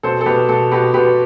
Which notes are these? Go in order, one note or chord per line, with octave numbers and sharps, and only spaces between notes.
B2 A4 C5
A4
B2 G4 B4
B2 A4
B2 G4 B4
B2 G4 B4